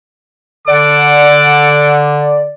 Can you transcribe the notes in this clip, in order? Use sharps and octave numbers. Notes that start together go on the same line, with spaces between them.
D3 A4 D5 F#5 D6